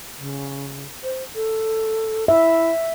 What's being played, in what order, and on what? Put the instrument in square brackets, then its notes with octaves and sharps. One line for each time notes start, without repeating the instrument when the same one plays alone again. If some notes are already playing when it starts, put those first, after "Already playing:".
[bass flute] C#3
C5
A4
[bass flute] E4 [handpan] E5